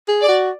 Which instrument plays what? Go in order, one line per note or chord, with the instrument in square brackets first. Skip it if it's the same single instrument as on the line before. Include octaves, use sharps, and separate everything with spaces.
[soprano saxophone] G#4
[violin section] D5
[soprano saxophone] F#4